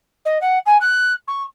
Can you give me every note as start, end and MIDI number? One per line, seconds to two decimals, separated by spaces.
0.25 0.38 75
0.41 0.59 78
0.66 0.77 80
0.81 1.13 90
1.28 1.43 85